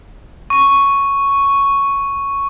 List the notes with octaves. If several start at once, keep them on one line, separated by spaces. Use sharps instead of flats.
C#6 D#7